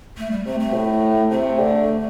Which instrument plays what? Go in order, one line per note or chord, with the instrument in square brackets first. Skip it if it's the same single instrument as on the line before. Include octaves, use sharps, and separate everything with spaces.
[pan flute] A3
G3
[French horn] C3 [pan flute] A3
[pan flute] A3
[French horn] A2
[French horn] C3 [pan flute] A3
[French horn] D3